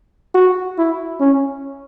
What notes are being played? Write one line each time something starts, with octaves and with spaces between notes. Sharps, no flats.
F#4
E4
C#4